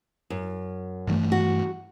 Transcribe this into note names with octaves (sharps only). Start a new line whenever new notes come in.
F#2
G2 E3 A3
F#4